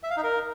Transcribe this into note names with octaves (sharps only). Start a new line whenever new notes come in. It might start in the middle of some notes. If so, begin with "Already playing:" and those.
E5
F5
D#4
A#4